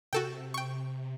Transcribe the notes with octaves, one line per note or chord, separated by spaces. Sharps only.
C3 F#4 A4 G5
G5 C#6